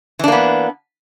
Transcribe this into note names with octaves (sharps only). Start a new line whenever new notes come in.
E3 A#3 B3 D4